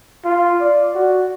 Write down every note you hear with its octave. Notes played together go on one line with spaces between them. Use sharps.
F4
D5
F#4